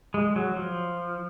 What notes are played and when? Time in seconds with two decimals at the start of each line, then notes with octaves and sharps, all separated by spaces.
0.14 G#3
0.36 F#3
0.56 F3